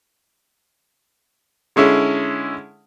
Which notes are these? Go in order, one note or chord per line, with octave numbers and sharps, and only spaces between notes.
D3 G#3 C#4 E4